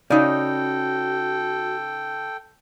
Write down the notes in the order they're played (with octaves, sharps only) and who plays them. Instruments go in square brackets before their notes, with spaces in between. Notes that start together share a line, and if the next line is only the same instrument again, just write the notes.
[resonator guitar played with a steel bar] C#3 D#4 [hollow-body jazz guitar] C#4 D5 [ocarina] F#4 [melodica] A4 G5